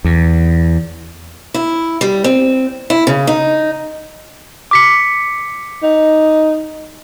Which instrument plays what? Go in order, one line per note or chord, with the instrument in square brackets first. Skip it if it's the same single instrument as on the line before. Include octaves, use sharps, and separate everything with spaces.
[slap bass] E2
[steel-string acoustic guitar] E4
G3
C4
E4
C#3
D#4
[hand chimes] D6 B6 C#7
[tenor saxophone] D#4